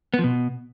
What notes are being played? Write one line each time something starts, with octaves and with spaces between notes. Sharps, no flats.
B3
F3
B2